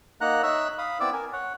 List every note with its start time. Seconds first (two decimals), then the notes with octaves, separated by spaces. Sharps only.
0.21 A#3 D#4 F#5 A#5 F#6
0.43 D#4 C#5 E5 E6 F#6
0.78 F5 B5 D#6
1.00 B3 C4 E4 D5 D6 E6
1.13 A#4 G#5
1.33 C#5 F#5